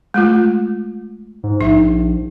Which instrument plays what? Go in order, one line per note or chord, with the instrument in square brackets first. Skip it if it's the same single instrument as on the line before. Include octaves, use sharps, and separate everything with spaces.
[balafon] G#3 A3 F4
[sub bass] G#2
[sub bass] A#1 [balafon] D#4 E5